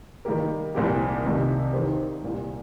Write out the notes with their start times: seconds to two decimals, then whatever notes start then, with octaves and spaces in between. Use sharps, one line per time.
0.25 D#3 G3 A#3 G4 A#4
0.75 C2 A#2 F3 C4 G4
1.24 C2 C3 D#3
1.73 D#2 D#3 A#3 G4 C5
2.23 C2 A#2 G3